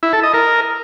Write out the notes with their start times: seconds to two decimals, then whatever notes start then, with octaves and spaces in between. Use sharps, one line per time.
0.03 E4
0.13 A4
0.23 D#5
0.34 A#4